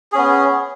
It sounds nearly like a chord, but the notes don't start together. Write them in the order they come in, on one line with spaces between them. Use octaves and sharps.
G#4 C#4 B3